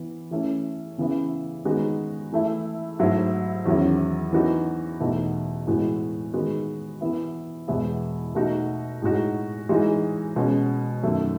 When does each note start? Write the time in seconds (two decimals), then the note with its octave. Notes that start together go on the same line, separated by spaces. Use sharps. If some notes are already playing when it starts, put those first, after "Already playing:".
Already playing: E3 B3
0.31 E3 A3 C#4
0.98 C#3 E3 B3 E4
1.65 D#3 G#3 B3 D#4 F#4
2.32 E3 A3 E4
2.99 G#2 F#3 A3 E4
3.66 E2 D#3 F#3 C#4 E4
4.33 E3 B3 D#4 F#4
5.00 E2 B2 A3 D#4
5.67 A2 E3 G#3 B3 F#4
6.34 D#3 G#3 B3 F#4
7.01 E3 B3 E4
7.68 E2 B2 G#3 B3 E4
8.35 B2 A3 D#4 F#4
9.02 A2 G#3 D#4 F#4
9.69 E3 G#3 D#4 F#4
10.36 B2 G#3 C#4
11.03 F#2 D#3 A3